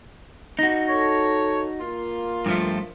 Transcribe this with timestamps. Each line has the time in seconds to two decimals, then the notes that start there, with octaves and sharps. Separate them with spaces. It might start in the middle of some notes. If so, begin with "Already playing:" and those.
0.59 D#4 F#4
0.89 A4 C#5
1.80 A#3 F4
2.46 G2 F3 A3